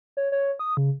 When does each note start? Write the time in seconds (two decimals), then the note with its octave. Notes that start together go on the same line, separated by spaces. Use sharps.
0.17 C#5
0.32 C#5
0.59 D#6
0.77 C#3